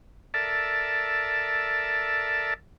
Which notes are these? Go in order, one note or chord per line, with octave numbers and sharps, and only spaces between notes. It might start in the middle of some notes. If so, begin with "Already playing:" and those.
A4 A#4 D5 E5 A5